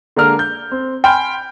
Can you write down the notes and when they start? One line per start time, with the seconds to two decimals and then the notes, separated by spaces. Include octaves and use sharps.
0.16 D3 G#3 A#3 D4 A#4 F6
0.39 G6
0.71 C4
1.04 G5 G#5 B5 C6 F6 G6